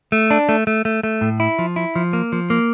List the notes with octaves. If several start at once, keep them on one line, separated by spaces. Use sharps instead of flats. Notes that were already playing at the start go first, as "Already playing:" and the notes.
A3
D4
A3
A3
A3
A3
A2
E4
F3
E4
F3
A#3
F3
A#3